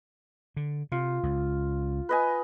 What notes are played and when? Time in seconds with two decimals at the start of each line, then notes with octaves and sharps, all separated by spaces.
0.57 D3
0.92 C3 F4
1.23 C#2
2.09 B4 D#5 G#5